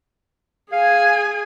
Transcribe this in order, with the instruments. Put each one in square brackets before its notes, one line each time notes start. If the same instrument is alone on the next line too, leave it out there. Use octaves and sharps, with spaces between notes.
[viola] G#4 G#5 [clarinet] F5